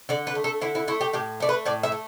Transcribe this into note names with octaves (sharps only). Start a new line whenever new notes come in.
D3 D5
B4
A3
A4
D3 E4
E4
A3 E4
G4
A2 G4
A3 D5
B4
A2 D5
E5
A3